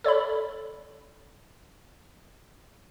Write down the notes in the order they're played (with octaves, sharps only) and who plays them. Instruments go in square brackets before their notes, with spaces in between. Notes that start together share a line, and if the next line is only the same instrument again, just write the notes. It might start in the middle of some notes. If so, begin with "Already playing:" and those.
[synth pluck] A4 C#5 D5 B5